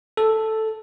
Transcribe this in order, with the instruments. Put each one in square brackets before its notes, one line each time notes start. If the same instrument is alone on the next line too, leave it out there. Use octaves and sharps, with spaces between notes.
[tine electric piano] A4